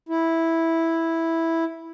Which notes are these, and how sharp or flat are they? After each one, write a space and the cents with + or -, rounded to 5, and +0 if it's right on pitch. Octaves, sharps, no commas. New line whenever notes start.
E4 -5